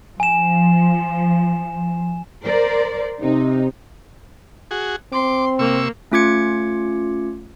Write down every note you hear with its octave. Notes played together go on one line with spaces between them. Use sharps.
F3 G#5 E7
A#4 C5 D5
C3 D#4
F#4 G#4
C4 C6 D6
C3 A#3 C#6 E6
A3 C#4 F4 D6 G#6 C#7